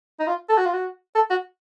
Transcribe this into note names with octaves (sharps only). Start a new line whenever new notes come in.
D#4
F4
A4
F#4
F4
F#4
A4
F#4